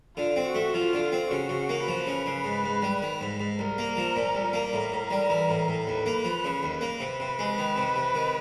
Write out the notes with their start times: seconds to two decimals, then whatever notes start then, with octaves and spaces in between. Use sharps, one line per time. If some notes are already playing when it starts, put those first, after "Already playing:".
0.16 D3 F4
0.36 C4
0.46 F#4
0.55 A3
0.73 F3 F4
0.93 D3
1.12 C4
1.31 C#3 F#4
1.49 C#3
1.69 A#3
1.87 F3 B4
2.07 C#3
2.26 C#3
2.44 G#2
2.64 G#2
2.82 G3
3.02 D#3
3.21 G#2
3.40 G#2
3.59 C2 A#4
3.78 A#3
3.97 F3
4.16 A#2
4.35 C2
4.53 A#3
4.72 A2 A#4
4.92 A2
5.11 G3
5.30 E3
5.49 A2
5.68 A2
5.87 D#2 B4
6.06 A#3
6.24 F3
6.44 C#3
6.63 D#2
6.81 A#3
7.00 C3 B4
7.20 C3
7.39 G#3
7.58 D#3
7.76 C3
7.96 C3
8.15 D#3